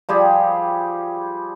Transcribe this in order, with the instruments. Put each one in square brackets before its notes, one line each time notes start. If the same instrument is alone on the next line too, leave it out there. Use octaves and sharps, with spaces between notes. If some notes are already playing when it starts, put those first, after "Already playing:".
[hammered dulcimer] F3 G3 G4 G#4